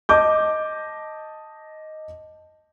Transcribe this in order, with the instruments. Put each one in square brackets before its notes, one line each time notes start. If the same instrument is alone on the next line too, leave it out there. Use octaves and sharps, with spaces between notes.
[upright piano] D#5 A5 D6 G6